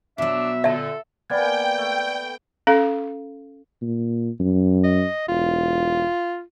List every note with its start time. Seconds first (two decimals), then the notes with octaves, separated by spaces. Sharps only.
0.18 B2 F#3 D4 E5
0.64 A#2 D3 A4 E5 A5
1.30 A#3 B3 D5 G5 G#5 G#6
1.78 A3
2.67 C#4 A4 F5
3.81 A#2
4.40 F#2
4.84 D#5
5.28 E1 F4